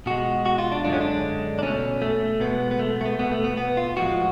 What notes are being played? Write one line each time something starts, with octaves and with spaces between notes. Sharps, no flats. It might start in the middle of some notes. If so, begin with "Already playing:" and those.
B2 G#3 F#4
F#4
F4
D4
F#2 D3 G#3 D4
C#4
D4
D4
B2 A3 C#4
A3
B2 G#3 B3
B3
A3
A3
B3
B2 A3 B3
A3
B3
B3
F4
A2 F3 G#3 F#4